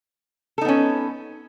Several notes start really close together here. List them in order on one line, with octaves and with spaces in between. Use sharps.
A4 D#4 B3 C#4